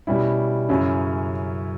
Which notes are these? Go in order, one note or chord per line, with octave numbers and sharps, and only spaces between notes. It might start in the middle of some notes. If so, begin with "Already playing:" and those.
B2 G3 C#4 E4
F#2 C#3 F#3 C#4 E4